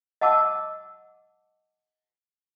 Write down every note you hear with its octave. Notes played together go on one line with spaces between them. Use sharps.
D#5 F#5 A5 D6 E6